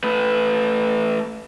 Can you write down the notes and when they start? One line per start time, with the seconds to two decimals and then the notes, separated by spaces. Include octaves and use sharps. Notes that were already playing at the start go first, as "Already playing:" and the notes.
0.04 A3 B4